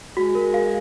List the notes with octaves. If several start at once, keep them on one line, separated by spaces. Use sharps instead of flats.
G#3 F#4
A#4
F5